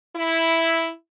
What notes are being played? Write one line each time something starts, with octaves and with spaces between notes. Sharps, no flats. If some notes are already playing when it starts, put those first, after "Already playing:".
E4